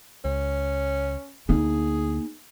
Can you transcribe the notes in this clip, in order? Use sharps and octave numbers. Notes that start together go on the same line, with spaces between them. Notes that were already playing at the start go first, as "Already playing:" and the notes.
C#2 C#4
D2 A#3 D#4 G#4